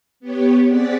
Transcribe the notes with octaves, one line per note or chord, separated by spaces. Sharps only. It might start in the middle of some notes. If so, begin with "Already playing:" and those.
B3 G4 C#5
C4 G#4 D5 F#5 A6 B6